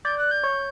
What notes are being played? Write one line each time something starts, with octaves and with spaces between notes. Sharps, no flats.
D5 G6
F#6
G6
C#5